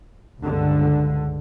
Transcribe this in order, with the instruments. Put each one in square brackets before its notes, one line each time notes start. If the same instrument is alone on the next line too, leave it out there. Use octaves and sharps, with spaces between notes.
[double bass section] C#2 G2 D3